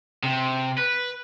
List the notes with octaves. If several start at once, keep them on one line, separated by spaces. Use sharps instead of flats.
C3
B4